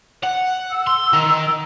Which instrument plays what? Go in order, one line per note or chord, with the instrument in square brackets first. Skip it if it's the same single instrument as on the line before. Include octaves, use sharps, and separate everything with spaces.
[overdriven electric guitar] F#5
[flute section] E6
[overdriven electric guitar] C6
D#3